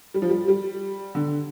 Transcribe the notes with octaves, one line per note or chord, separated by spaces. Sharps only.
G3
F3
G3
G3
D3